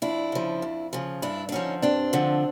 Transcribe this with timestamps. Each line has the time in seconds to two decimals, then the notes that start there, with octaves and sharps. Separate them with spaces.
0.02 F2 D4 E4
0.32 C#3 F3
0.62 F2
0.93 C#3 F3
1.22 G2 D4 E4
1.49 D4
1.52 D3 F3 C#4 D#4
1.82 G2 C4 D4
2.13 D3 F3